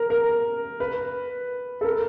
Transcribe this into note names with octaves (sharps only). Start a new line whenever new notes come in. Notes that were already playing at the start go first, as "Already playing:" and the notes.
Already playing: A#4
A#4
B4
A4
A#4